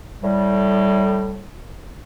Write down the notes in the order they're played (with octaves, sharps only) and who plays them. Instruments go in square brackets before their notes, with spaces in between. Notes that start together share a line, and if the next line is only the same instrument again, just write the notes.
[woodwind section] A2 G3